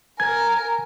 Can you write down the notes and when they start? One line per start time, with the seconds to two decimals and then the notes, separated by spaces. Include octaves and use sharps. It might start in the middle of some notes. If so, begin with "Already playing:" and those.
0.20 A#4 G#5 G#6